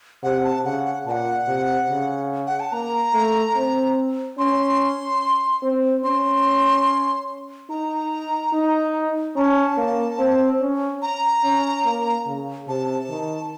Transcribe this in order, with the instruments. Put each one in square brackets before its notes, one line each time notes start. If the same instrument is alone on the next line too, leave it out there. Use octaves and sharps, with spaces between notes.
[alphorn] C3 [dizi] F#5
[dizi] A5
[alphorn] C#3 [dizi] F#5
[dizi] F#5
[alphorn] A#2 [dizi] F#5 A5
[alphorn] C3
C#3
[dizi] F#5
A5
[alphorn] A#3 [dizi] A#5
[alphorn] A3
C4
[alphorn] C#4 [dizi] C6
[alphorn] C4
[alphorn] C#4 [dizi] C6
[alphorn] D#4 [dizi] A#5
[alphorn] D#4
[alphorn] C#4 [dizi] A#5
[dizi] A5
[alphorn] A#3
C4
C#4
[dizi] A#5
[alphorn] C#4
A#3
C#3
[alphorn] C3 [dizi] A5
[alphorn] D#3